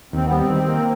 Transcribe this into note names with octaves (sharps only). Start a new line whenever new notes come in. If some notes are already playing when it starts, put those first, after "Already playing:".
D#2 C4
B3
G3
C4
D#3
A#3